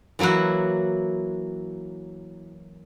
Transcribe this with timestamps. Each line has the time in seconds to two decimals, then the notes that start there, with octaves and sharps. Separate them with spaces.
0.19 E3 F#3 A#3 E4 F#4